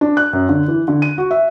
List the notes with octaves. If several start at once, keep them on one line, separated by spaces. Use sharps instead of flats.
D4
F#6
F#2
D3
E3
D3
D#7
F#4
E5